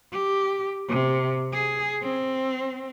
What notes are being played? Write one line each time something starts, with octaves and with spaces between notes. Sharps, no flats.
G4
C3
G#4
C4